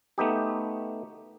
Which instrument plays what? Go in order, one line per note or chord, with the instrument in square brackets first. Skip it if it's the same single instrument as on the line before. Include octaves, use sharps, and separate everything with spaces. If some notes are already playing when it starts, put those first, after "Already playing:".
[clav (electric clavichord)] A3 B3 D#4 G4